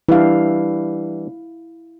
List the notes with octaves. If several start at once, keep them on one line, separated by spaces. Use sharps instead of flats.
E3 G3 D4 E4 F5